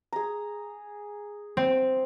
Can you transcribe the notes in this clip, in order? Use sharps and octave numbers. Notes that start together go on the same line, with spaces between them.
G#4 A#5
C4